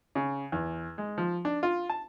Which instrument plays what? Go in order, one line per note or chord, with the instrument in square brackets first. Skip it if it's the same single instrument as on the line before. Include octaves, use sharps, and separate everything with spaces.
[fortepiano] C#3
E2
G#3
F3
D4
F4
A5